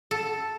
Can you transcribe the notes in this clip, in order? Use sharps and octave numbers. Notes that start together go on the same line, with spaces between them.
A4